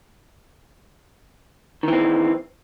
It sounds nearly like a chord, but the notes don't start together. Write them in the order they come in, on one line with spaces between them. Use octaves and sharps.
D#3 E3 C4